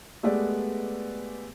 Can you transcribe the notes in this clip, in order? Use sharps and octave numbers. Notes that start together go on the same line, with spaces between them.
G#3 A3 B3 G4 B4 D5